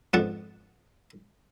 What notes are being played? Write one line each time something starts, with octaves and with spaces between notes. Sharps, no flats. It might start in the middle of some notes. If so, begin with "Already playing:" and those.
F2 G#2 B3 D4 F#5 A5